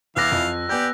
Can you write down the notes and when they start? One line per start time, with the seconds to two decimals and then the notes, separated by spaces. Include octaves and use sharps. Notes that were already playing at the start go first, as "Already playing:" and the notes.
0.16 E2 E3 F5 D6 E6 F#6 A6 A#6
0.32 F2
0.69 B3 G4 D5 G#5 G6